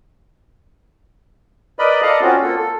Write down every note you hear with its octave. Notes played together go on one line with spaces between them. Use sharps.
A#4 B4 D5 D#5 B5
A4 D5 D#5 F5 A5 A#5
C4 C#4 F4 F#4
A#3 F4 A4
A4